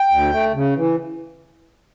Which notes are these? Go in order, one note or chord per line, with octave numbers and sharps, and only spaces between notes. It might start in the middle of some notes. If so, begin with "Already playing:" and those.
Already playing: G5
D2
A3
C#3
E3